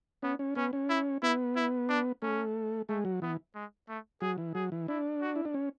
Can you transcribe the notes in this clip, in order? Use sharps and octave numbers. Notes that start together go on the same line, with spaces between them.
B3 C#4
C#4
B3 C#4
C#4
E4
B3 E4
E4
D4
A3 C#4
G#3 A3
F#3
E3 B3
G#3
A3
F#3 G#4
E3
F#3 G#4
E3
D4 E4
F#4
E4
D4
C#4